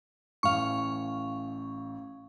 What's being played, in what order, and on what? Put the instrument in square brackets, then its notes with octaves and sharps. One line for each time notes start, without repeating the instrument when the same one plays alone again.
[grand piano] A1 [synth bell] F5 C#6